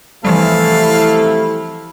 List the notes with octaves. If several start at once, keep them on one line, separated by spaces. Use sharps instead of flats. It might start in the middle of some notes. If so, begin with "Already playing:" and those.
C3 E3 F3 G3 A3 E4 A4 F5